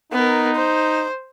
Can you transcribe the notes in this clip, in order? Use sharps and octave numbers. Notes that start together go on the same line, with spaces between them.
B3 D#4 A#4
C5